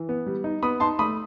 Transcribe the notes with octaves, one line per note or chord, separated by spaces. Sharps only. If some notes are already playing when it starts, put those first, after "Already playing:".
Already playing: E3
B3
G3
D#4
B3 B5 D#6
D#4 A5 C6
A3 B5 D#6